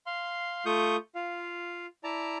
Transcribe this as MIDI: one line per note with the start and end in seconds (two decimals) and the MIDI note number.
0.06 0.65 77
0.06 0.65 84
0.66 0.96 57
0.66 0.96 65
0.66 0.96 85
0.66 0.96 87
0.66 0.96 91
1.15 1.86 65
1.15 1.86 77
2.04 2.38 64
2.04 2.38 74
2.04 2.38 81
2.04 2.38 82